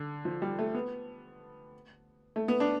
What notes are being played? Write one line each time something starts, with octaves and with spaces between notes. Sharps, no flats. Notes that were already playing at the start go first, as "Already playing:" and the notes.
Already playing: D3
F3
G3
A3
B3
A3
B3
D4